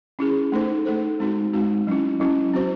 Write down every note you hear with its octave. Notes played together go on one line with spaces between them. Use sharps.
C#4 E4 G#4
A3 D#4 A4 C5
A3 D#4 A4 C5
G#3 C4 D#4 F#4
G#3 C4 D#4 F#4
F#3 C#4 E4
F#3 C#4 E4
C4 F#4 C5